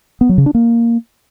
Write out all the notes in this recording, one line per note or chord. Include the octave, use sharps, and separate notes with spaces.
B3
F#3
C#3
D4
A#3